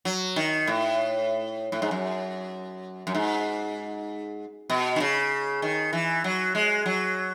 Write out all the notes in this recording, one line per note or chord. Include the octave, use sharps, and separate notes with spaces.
F#3
D#3
A2
A2
G#2
F#2
F#2
G#2
B2
D#3
C#3
D#3
E3
F#3
G#3
F#3